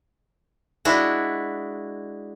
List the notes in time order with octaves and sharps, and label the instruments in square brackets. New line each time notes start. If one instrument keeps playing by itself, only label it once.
[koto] G#3 D4 E4 F#4